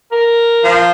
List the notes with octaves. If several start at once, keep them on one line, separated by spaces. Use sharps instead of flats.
A#4
F3